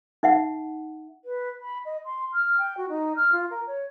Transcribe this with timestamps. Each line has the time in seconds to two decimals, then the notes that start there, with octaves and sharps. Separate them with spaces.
0.23 D#4 E5 F#5
1.24 B4
1.60 B5
1.85 D#5
2.05 C6
2.33 F6
2.58 G5
2.77 F#4
2.89 D#4
3.16 F6
3.32 F4
3.50 A#4
3.67 C#5